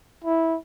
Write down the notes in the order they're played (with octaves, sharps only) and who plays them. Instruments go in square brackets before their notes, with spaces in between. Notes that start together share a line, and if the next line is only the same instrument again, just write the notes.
[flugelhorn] E4